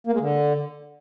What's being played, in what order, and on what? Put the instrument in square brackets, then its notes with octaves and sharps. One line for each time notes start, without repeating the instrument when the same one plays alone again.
[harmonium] A#3
G#3
D3